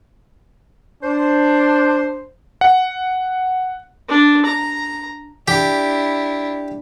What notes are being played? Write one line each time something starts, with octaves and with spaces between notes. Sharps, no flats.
D4 C5
F#5
D4
A#5
D4 E4 G4